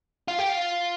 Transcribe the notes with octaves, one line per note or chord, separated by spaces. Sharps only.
F4
G4
F4